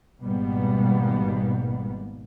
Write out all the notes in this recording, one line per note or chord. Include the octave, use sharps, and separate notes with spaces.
G#1 G#2 B2 G3 A#3 B3